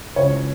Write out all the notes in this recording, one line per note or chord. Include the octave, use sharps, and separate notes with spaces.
C#2 C#5